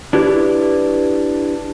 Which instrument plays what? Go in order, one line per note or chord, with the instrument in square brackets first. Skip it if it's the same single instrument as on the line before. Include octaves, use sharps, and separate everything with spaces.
[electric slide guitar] D4 E4 G4 B4